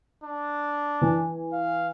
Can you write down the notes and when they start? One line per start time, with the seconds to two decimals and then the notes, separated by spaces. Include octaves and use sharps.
0.24 D4
1.02 E3
1.53 F5